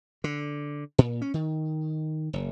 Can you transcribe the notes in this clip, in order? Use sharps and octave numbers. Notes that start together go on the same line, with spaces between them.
D3
A#2
C#4
D#3
F#1